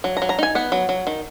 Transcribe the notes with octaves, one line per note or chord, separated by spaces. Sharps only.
F#3
A#5
F#3
A#5
D#4 G#5
B3 F#5
F#3
F#3
D#3